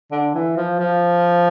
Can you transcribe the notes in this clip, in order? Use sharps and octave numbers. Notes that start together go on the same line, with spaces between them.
D3
E3
F3
F3